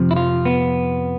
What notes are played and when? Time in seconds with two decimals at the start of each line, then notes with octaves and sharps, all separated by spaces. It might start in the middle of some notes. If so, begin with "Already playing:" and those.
Already playing: F2 C3 F3
0.11 E4
0.16 F4
0.45 B3